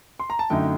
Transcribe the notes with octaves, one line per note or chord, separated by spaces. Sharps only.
C6
A#5
A5
F#2 D3 A3 D#4 G5